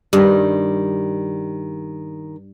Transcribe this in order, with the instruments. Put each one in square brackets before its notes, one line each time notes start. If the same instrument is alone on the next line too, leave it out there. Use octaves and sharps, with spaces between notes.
[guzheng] G2 [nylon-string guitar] D#3 G3